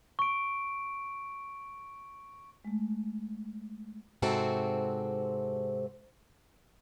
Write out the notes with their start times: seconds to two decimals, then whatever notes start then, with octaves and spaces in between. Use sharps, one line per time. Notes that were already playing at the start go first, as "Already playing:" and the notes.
0.19 C#6 D7
2.65 G#3 A3
4.22 G#2 C3 C4 F#4 A4